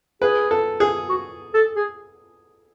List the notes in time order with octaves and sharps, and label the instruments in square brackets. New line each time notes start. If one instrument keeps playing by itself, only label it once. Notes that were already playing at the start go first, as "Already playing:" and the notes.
[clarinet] G#4 [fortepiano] B4
[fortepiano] A4
G#4
[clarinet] F#4
A4
G#4